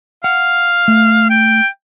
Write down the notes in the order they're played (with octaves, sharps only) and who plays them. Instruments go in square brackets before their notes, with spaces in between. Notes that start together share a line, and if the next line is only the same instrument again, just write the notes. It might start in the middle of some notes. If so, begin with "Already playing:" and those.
[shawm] F5 [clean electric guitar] F#5
[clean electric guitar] A3
[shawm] G5